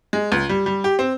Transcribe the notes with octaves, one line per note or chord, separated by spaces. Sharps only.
G#3
C#2
G3
G3
G4
C4